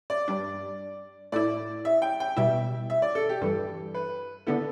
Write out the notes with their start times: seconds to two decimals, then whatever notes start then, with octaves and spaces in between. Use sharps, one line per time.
0.10 D5
0.28 G2 G3 D4
1.32 A2 A3 E4 D5
1.85 E5
2.02 G5
2.20 G5
2.37 B2 G3 E4 E5
2.90 E5
3.02 D5
3.15 A4
3.29 G4
3.42 G2 E3 G3 A4
3.94 B4
4.47 D3 B3 E4 A4